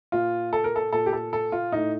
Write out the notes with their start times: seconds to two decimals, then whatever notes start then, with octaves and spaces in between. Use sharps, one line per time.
0.12 A#2 F4
0.53 A4
0.64 A#4
0.76 A4
0.92 A#2 A4
1.06 G4
1.13 A4
1.33 A4
1.52 F4
1.72 A2 D#4